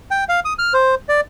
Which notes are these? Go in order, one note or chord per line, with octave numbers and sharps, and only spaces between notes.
G5
F5
D#6
F6
C5
D5